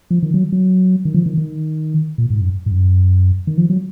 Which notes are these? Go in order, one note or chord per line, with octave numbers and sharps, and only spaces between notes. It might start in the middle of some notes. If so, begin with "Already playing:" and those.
F3
D#3
F#3
F#3
D#3
F3
D#3
D#3
A#2
G#2
F#2
G#2
F#2
D#3
F3
F#3